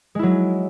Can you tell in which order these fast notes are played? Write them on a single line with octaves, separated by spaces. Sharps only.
G#3 E4 F#3